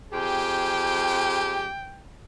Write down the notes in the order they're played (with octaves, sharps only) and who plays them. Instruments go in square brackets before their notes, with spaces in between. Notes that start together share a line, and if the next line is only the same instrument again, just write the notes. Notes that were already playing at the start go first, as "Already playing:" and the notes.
[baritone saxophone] F2 [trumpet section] G4 G#4 [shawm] G5